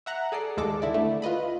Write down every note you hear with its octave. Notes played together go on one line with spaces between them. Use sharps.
E5 F#5 A#5
G#4 A4 D5 C7
D#2 G#3 A4 D6 A#6
D3 E4 D5
A3
F4 B4 D#5 B5